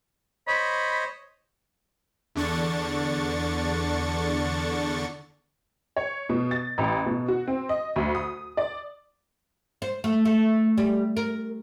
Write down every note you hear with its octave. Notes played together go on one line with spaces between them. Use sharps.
C5 C#5 D#5 B5
E2 D3 D4 C#6 A6
C#5
B2
A6
A1
B2
F#4
C4
D#5
D2
D#6
D5
C5
A3
A3
G3
A#4